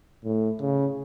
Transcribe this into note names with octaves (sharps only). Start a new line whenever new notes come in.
A2
C#3